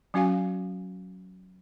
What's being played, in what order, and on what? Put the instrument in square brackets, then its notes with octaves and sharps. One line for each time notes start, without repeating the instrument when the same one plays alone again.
[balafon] F#3 C#4 F#4 F5 G#5